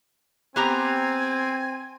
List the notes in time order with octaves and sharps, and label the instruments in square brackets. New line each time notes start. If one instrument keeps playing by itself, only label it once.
[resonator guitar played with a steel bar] B3 G4 A#5 [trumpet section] C4 [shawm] G#5